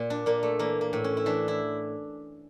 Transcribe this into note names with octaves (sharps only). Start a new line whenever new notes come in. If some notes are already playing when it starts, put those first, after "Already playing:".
Already playing: A#2
D4
A#2 A#3
A3
E3 A#3
A#3
A2
C#4
E4
E3 D4
E4